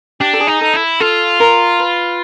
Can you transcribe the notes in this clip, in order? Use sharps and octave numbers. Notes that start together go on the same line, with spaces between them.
D4 G4
A4
G#4
D#4
A4
E4
F4 A4
A#4
B4